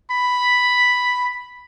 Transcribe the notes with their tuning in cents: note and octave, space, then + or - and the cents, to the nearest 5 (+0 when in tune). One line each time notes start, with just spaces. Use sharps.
B5 +0